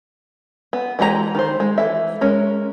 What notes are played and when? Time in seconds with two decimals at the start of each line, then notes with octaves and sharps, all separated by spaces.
0.73 B3
0.99 E3 G#3 G4 G#4 A#5
1.35 D#3 C5
1.60 G#3
1.78 E3 A4 E5
2.21 G#3 C#4 A#4